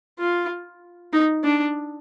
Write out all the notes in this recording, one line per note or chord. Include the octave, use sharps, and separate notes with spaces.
F4
D#4
D4